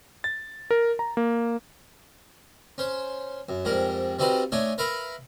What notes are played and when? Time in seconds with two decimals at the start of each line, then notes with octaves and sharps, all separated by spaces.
0.24 A6
0.71 A#4
0.99 A#5
1.17 A#3
2.78 C#4 C5
3.49 F#2
3.65 F2 G#2 G3 A#4
4.19 G3 C4 D#4 F#4 B4 F5
4.52 A3 D4 D#4 C#5 G#5
4.78 A#4 B4 E5 F5 A#5 B5